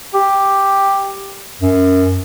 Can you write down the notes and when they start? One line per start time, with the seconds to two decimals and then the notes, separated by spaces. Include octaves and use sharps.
0.14 G4
1.62 F#2